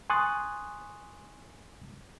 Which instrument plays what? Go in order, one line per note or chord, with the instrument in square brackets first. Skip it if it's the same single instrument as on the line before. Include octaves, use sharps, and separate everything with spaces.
[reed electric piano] G#5 C6 C#6 D#6 F#6 A6